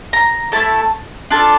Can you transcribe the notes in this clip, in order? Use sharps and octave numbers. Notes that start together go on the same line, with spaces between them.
A#5
A3 E4 A4 A5
D4 F4 A4 A5